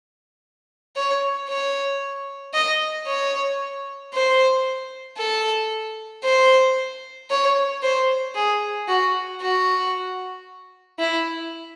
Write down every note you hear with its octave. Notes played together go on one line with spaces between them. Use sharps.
C#5
C#5
D#5
C#5
C5
A4
C5
C#5
C5
G#4
F#4
F#4
E4